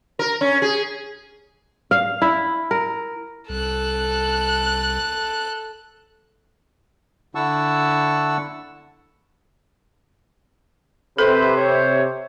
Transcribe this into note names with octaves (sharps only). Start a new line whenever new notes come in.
A#4
C#4
G#4
F5
E4
A#4
C2 A4 F#6
D3 E4 F#5 A5 C#6 E6
C3 A4 B4 C5
C#5